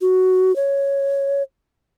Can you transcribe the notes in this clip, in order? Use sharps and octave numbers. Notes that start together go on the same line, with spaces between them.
F#4
C#5